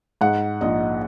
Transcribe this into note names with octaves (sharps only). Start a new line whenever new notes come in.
G#2 F#5
A#1 D#5